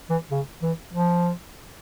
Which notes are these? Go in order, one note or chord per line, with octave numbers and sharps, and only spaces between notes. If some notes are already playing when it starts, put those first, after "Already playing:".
E3
C#3
E3
F3